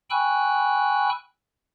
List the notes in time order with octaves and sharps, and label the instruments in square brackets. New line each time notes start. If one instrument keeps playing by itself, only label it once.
[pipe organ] G5 G#5 B5 C#6 E6 F#6